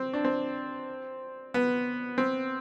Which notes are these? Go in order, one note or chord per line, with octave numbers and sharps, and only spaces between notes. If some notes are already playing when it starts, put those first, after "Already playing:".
Already playing: C4
D4
C4
B3
C4